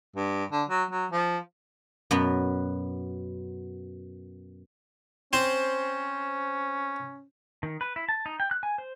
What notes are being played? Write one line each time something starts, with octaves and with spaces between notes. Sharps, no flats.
G2
D3
F#3
F#3
F3
F#2 B2 B3
C4 C#4 C5
D#3
B4
E4
A5
D#4
G5
F#6
G#5
C5